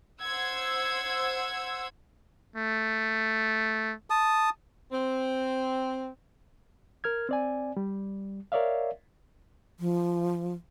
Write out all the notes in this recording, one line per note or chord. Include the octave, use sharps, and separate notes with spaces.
C5 F#5 E6 G#6
A3
A5 D#6
C4
A#4 F6 G#6
C4 D5 G#5
G3
A#4 C#5 D5 E5 F5
F3